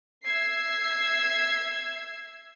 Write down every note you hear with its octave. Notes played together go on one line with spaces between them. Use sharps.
E5 E6 G#6 C7